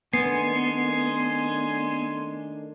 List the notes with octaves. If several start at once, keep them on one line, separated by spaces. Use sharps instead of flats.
D#3 A3 B3 D4 G#5 C6 C7